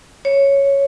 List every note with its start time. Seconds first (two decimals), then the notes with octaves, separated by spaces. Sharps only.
0.25 C#5